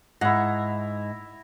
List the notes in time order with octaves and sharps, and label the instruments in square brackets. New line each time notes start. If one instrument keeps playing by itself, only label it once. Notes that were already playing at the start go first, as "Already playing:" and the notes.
[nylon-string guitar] G#2 [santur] E4 A#5 [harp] F#5